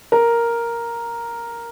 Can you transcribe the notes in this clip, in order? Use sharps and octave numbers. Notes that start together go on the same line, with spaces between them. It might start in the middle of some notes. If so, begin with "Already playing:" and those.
A#4